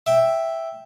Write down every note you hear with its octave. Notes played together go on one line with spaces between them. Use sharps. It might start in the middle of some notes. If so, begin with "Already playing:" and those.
E5 G5